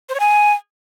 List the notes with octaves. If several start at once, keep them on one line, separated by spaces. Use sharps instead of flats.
C5
C#5
G#5